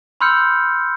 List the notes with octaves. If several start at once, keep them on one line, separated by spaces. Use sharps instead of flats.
B5 C6 E6 F6 G6 C#7